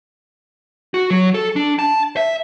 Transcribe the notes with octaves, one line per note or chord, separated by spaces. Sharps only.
F#4
F#3
A4
D4
A5
E5